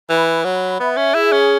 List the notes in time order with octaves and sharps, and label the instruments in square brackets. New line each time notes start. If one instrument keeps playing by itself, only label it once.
[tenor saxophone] E3 [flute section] B5
[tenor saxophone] F#3 [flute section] B5
[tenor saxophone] B3 [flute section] E5
[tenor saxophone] C#4
[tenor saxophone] E4 [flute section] G#4
[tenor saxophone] C#4